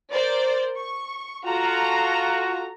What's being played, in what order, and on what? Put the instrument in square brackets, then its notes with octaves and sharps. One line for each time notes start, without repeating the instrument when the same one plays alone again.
[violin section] A#4 C5 D5
C#6
[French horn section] F4 F#4 [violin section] A4 A#5